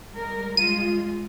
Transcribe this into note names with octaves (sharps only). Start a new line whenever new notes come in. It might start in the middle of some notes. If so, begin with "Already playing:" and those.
G3 G#3 A#4
G#3 F4 D#7